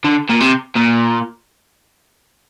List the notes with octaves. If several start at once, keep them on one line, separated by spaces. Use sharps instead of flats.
D3
A#2
C3
A#2